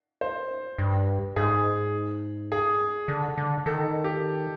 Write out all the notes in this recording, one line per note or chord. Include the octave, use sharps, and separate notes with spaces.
C5
G2
G#2 G#4
G#4
D3
D3
D#3 A4
G4